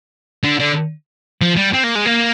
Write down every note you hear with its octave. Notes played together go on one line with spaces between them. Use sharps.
D3
D3
F3
G3
C4
A#3
G#3
A#3